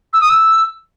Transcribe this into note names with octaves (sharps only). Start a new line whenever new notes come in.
E6
D#6
E6